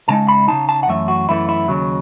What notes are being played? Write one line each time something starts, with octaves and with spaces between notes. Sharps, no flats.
C#3 G#3 D#4 A5
B5
C#3 G#3 D#4 A5
A5
F#5
F#2 E3 A3 E5
F#4
F#2 E3 A3 E4
E4
D#2 C#3 F#3